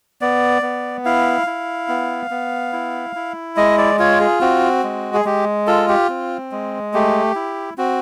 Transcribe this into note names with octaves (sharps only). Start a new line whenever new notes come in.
B3 D5
B3
E4 F5
E4
B3
B3
E4
E4
G#3 D#5
D5
F4 C#5
G#4
C4 F#4
G#3
G#4
G#3 G4
F4 A4
G4
C4
G#3
A3 G4
E4
C4 F#4